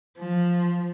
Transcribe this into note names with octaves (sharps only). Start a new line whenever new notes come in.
F3